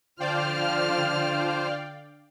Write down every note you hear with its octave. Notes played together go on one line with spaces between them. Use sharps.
D3 F3 F4 C5 D5 F5 G5 F6